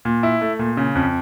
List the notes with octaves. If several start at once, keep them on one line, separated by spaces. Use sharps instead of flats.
A#2
E4
A3
A#2
C#3
F2